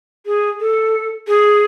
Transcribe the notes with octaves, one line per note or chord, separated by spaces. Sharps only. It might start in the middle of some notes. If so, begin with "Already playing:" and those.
G#4
A4
G#4